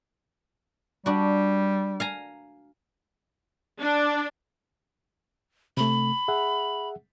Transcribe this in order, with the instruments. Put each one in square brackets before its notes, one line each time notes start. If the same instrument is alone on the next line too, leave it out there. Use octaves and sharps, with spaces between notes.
[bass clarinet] G3 [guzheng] D4 F#4
[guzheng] F5 G#5 A#5
[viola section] D4
[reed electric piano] C3 A3 [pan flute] B5
[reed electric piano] G#4 E5 F#5